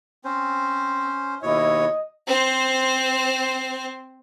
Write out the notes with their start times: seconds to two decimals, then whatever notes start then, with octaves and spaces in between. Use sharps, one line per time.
0.24 C4 C#4 C5
1.43 D#2 B2 E4 C#5 D#5
2.27 C4 C5